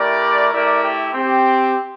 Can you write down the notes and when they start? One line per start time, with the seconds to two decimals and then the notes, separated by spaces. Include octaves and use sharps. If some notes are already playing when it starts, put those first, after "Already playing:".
Already playing: A3 E4 G4 A#4 D5
0.52 A3 E4 G4 A#4 D5
0.83 G4
1.14 C4 G4